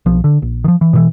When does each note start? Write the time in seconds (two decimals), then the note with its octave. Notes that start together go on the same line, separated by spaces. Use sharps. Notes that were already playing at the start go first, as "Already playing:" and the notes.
0.06 B1 F3
0.24 D3
0.42 A#1
0.64 D#3 F3
0.81 E3
0.93 B2 D3 E3